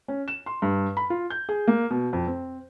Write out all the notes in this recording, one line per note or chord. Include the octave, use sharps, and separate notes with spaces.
C#4
E7
C6
G2
B5
F4
G6
G#4
A#3
B2
F2
C4